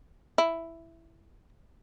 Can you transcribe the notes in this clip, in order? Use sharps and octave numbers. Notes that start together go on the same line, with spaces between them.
E4